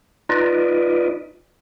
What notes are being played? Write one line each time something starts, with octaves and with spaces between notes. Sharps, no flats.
D#4 F4 B4 D5 D#5